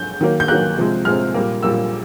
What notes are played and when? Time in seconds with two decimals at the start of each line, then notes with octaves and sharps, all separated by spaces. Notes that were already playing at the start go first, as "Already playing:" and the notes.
Already playing: G6
0.21 D#3 F#3 A#3
0.40 G6
0.48 D#3 F#3 A#3 F#6
0.77 C3 F3 G#3
1.05 C3 F3 G#3 F6
1.34 A#2 G3 A#3
1.63 A#2 G3 A#3 E6